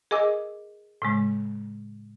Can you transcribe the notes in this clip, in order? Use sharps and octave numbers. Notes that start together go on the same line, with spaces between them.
G#4 A#4 D#5 G#5 D6 E6
A2 C#3 G#3